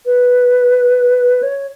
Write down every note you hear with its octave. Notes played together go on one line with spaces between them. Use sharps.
B4
C#5